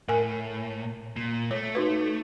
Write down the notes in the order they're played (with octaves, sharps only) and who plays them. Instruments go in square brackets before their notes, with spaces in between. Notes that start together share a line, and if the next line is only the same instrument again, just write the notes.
[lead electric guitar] A2 [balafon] A#4 G#5
[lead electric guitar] A#2
[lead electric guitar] A3 [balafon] C#5
[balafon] D#4 F#4 B4